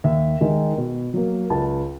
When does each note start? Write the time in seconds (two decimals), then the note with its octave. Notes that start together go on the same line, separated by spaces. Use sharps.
0.04 D#2 E5
0.41 D#3 G#3
0.77 B2
1.14 F#3 A#3
1.50 C#2 A5